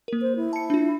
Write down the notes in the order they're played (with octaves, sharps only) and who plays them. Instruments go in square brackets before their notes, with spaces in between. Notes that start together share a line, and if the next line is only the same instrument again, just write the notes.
[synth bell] A#3 A#4
[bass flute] C5
E4
[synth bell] A5 C#7
D4 F4